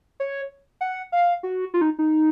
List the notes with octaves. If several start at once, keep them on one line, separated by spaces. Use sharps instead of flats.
C#5
F#5
F5
F#4
F4
D#4
D#4